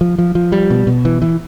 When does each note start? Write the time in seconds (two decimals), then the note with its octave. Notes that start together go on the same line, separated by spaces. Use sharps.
0.01 F3
0.18 F3
0.35 F3
0.52 G3
0.70 B2
0.87 B2
1.05 E3
1.22 E3